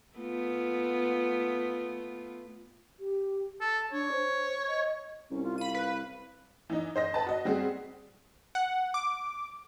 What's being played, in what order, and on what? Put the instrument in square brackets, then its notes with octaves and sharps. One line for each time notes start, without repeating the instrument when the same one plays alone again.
[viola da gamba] A3 B3 F4
[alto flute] G4
[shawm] A4 [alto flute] A5
[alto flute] D4 [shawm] C#5
[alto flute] C5
D#5
[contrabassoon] C2 [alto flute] C#4
[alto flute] F4
[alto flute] F5 [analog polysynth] B5 D#7
[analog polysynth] B4
[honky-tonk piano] E3 D#4
C5 D#5 A#6
B4 A5
F#4 D#5
G3 C4 F#4 G#4
[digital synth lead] F#5
D6